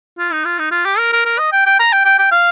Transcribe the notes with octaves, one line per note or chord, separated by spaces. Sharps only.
F4
D#4
F4
D#4
F4
G4
A#4
A#4
A#4
D#5
G5
G5
A#5
G5
G5
G5
F5